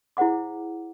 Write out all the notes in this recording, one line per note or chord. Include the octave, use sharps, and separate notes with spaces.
E4 G#4 C5 F#5 D6